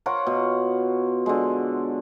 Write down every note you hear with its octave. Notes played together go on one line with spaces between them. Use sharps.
F4 A#4 C#5 F#5
B2
D3 G#3